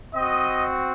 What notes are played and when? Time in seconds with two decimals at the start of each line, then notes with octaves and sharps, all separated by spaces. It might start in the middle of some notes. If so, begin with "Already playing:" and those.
0.14 C4 F#4 D#5